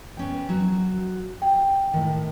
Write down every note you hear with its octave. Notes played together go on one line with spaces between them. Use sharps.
B3 C#4 G5
F#3 F#4
G#4 G5
A2 D#3